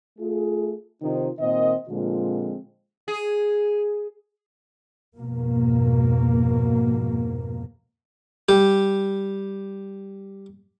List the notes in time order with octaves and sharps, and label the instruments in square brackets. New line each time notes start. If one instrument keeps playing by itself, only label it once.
[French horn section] A3 F4 G#4
C3 D#3 D#4 F4 C5
A#2 D#3 C4 D#5
A#2 D3 F3 G#3 C4 F4
[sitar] G#4
[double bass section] F2 G#2 B2 A#3
[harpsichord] G3 G4